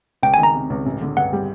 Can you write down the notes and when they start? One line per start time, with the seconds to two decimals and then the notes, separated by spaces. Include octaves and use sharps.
0.23 C#2 G5
0.34 G#5
0.38 D#3
0.43 A#5
0.54 C3
0.70 C#2
0.86 A1
1.01 D3
1.17 G2 F#5
1.33 G3